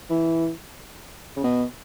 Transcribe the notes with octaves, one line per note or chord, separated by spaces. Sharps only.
E3
C#3
B2